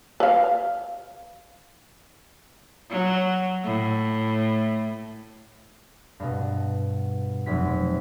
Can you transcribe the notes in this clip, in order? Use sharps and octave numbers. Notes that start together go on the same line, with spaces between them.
B4 F5
F#3
A2
G2 B2
F1 F#3 B6